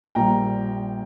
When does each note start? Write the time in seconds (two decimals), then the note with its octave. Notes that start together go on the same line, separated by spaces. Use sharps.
0.15 A#1 A#2 G3 G5 A#5